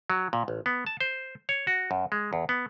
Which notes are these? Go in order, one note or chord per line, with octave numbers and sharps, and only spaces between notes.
F#3
A#2
A1
B3
A5
C5
C#5
F#4
F#2
G#3
E2
B3